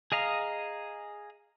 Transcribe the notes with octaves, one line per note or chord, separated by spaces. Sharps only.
G#4 D#5 F5 A#5